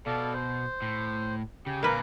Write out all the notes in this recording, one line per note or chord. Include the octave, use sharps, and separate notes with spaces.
B2 A4 D5 F5
C5
A2
C#3 G4
A#2 D3 A#3 A#4 B4 F5 D6